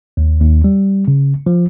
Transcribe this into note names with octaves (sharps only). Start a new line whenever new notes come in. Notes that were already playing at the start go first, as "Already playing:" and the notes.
D#2
D#2
G3
C#3
F3